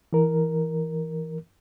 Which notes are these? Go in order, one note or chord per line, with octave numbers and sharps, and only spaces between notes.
E3 A#4